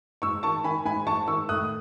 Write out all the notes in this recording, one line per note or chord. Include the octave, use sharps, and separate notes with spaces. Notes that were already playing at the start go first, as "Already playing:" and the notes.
G#2 C#6 E6
D#3 A5 C#6
D#3 G#5 B5
G#2 G#5 B5
G#2 A5 C#6
D#3 C#6 E6
A2 D#6 F#6